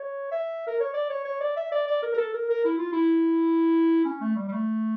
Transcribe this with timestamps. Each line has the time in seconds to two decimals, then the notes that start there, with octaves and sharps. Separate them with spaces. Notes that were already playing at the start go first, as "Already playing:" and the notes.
Already playing: C#5
0.32 E5
0.67 A#4
0.80 C#5
0.94 D5
1.10 C#5
1.25 C#5
1.41 D5
1.57 E5
1.72 D5
1.87 D5
2.03 A#4
2.14 A#4
2.18 A4
2.34 A#4
2.50 A#4
2.65 E4
2.78 F4
2.92 E4
4.05 C#4
4.21 A3
4.36 G3
4.48 G3
4.52 A3